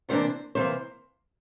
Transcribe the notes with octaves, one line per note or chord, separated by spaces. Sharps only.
C3 E3 G3 A#3 D4 C5
C3 E3 G3 A#3 C5